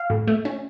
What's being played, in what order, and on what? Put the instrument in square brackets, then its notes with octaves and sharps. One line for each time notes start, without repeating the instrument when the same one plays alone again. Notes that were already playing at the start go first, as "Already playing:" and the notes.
Already playing: [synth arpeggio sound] F5
A2
A3
C#4